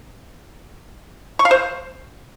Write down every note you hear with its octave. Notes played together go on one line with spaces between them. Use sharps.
C#6
F5
C5